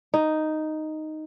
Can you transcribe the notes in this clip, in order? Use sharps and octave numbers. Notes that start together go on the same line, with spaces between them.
D#4